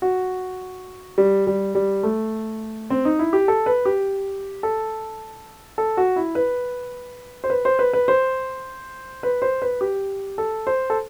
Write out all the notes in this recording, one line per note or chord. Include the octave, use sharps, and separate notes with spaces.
F#4
G3
G3
G3
A3
C4
D#4
E4
G4
A4
B4
G4
A4
A4
F#4
E4
B4
C5
B4
C5
B4
B4
C5
B4
C5
B4
G4
A4
C5
A4